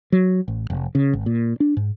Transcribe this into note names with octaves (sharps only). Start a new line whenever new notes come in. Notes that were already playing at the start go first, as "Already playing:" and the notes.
F#3
A1
F1
C#3
G#1
A#2
D4
G#2